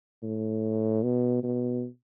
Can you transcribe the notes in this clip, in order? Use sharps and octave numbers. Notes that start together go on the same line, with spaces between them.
A2
B2
B2